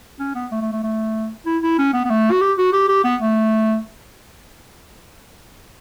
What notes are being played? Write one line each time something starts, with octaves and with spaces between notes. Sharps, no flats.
C#4
B3
A3
A3
A3
A3
E4
E4
C#4
B3
B3
A3
F#4
G4
F#4
G4
G4
B3
A3